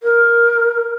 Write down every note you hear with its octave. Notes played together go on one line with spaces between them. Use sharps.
A#4